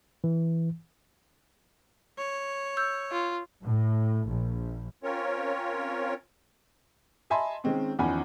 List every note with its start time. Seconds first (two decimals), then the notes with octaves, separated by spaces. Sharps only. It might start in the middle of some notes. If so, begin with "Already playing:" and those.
0.24 E3
2.18 C#5
2.77 E6 G6
3.12 F4
3.62 A2
4.26 A#1
5.03 C4 C#4 F4 A#4 C#5
7.30 D#5 E5 G#5 A5 B5 C6
7.64 D#3 G#3 C4 C#4
7.99 E2 D#3 F3 C#4 G#5 B5